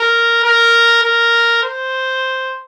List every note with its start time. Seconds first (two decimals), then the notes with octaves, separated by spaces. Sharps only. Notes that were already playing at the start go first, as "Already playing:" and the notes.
Already playing: A#4
0.44 A#4
1.03 A#4
1.63 C5